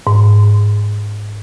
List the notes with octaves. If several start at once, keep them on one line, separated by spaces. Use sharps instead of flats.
G#2